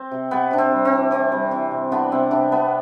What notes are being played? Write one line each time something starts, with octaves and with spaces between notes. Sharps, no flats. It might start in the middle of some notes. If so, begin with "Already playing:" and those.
Already playing: C4
C3
C3 B3
C3 D4
C4
G3
C4
E3
E3 C4
G3
E3
C3
E3 B3 D4
C3 C4
C3 B3 D4
C3 B3